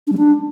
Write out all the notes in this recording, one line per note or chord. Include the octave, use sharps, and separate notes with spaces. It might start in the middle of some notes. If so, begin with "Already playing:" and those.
D4
G3
D4